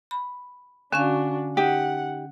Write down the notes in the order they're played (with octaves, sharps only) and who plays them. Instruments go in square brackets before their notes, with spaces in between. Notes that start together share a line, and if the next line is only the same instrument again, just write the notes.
[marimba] B5
[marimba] D3 C#4 F5 [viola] D4 F#4 [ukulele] G#5
[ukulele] D#4 G4 [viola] F#5